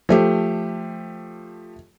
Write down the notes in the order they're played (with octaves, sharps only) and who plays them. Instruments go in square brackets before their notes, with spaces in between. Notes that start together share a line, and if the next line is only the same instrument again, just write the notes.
[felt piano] F3 A3 G4